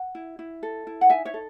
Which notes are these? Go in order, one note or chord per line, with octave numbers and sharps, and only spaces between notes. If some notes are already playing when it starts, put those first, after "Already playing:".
Already playing: F#5
E4
E4
A4
E4
F#5
D#4 E5 G#5
C#5 E5
A4